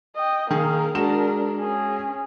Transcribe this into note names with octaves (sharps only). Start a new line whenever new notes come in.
D#5 G5
D#3 A#3 G#4 A#4
G#3 D4 F#4 A#4 E7
C#4 G#4